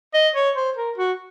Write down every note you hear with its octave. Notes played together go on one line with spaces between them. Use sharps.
D#5
C#5
C5
A#4
F#4